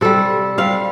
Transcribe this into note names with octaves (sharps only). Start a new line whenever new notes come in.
C3 G3 A4
C3 G3 F5